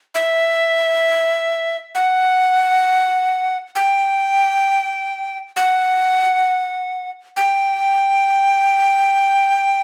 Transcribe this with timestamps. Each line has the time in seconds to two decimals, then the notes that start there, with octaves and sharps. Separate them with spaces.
0.15 E5
1.95 F#5
3.75 G5
5.56 F#5
7.37 G5